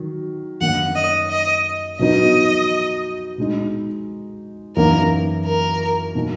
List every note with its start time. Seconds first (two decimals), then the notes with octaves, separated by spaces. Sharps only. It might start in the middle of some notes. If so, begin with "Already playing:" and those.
Already playing: D#3 F#3
0.60 F#2 D#3 A#3 D#4 F#5
0.96 D#5
1.30 D#5
1.99 B2 F#3 B3 D#4 D#5
3.38 B2 G#3 D#4
4.76 F#2 E3 A#3 D#4 A#4
5.46 A#4
6.15 B2 F#3 A#3 D#4